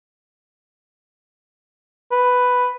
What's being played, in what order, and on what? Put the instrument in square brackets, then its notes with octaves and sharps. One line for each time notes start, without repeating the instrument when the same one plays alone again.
[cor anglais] B4